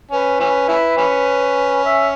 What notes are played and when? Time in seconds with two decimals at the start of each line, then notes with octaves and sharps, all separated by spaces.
0.11 C#4 B4
0.40 E3 C#4
0.69 C#4 E4
0.98 E3 C#4
1.84 E5